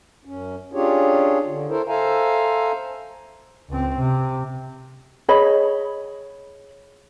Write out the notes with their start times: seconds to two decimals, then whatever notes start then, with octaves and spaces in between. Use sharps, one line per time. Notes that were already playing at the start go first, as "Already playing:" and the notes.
0.25 F#2 C#4
0.73 C#4 D4 F4 G4 G#4 C#5
1.45 D3
1.69 E4 A4 A#4 C5
1.88 A4 C5 E5 F5 G#5 A#5
3.69 C#2 C4
3.98 C3
5.28 G#4 C#5 D#5 B5